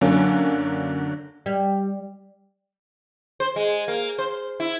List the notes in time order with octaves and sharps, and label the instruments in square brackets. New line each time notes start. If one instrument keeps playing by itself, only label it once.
[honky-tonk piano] F#2 D3 F#3 A#3 C#4 D4
[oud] G3
[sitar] C5
G#3
A#3
C5
E4